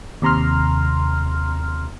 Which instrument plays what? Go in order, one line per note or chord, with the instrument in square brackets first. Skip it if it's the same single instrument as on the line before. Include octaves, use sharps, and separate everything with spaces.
[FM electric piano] D#2 C3 A#5 C6 F6